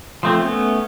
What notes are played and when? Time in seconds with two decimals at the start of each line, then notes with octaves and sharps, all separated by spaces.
0.23 F3 A3 C4
0.41 A3 B3 C#4